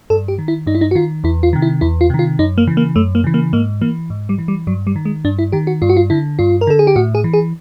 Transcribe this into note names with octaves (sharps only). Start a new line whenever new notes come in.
G2 A4
G4
D#3
E4
G2 D#4
E4
D#4
F#4
D#3 F4
E2 E4
F4
C3 D#3
E4
E2 E4
F4
C3 D#3
F4
F#2 D#4
A#3
C#3 E3
A#3
F#2 A3
A#3
C#3 E3
A#3
G#2 A#3
E3 A#3
G#2
G3
E3
G3
G2 F#3
G3
D#3
G#3
G2 D4
E4
D#3 G4
F#4
G2 F4
F#4
F4
D3 E4
G2 F4
A#4
D3 A4
G#4
G4
A2 F#4
G#4
E3
G#4